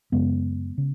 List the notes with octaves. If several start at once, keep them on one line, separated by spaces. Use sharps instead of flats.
F#2 C#3 G#3 B3
C#3